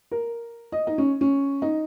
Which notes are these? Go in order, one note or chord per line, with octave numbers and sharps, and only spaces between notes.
A#4
D#5
D#4
C#4
C#4
D#4